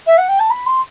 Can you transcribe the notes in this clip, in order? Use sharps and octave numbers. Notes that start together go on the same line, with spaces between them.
E5
F#5
G5
A5
B5
C6